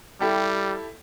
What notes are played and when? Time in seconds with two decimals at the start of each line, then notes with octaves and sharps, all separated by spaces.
0.21 G3 E4 G4 A4